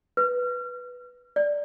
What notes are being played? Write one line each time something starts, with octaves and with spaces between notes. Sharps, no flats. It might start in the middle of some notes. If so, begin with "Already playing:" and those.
B4
D5